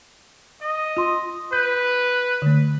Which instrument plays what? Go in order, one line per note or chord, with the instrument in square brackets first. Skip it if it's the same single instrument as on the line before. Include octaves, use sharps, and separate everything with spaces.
[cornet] D#5
[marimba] F4 C6
[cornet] B4 [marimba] G6
[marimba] D3 A3